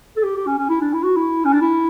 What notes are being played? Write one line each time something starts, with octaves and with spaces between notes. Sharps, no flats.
A4
G4
G4
C#4
C#4
E4
D4
E4
F#4
E4
C#4
D4
E4